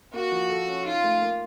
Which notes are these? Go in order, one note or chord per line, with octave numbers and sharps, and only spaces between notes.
A#3 F#4
F3
A4
C#4
D#4 F4
A3
A#3